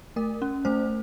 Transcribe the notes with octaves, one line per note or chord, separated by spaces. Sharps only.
A3 A#4
C#4
A3 C5